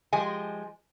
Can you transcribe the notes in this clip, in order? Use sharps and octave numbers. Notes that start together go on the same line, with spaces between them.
F3 G#3 G4 D#5 G#5